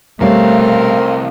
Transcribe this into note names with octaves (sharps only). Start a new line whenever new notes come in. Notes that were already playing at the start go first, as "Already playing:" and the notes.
C2 B2 G3 A3 C4 A#4 C#5 F5